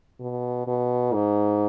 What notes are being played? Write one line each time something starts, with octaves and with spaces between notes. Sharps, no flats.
B2
B2
G#2